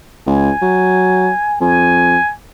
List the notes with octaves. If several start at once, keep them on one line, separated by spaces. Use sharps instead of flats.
C#2 G#5
F#3
F2 G#5